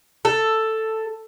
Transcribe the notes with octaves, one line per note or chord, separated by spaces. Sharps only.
A4